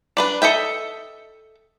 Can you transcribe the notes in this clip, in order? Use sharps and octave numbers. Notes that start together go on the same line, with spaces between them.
D4 B4 D5
A4 D#5 E5 G5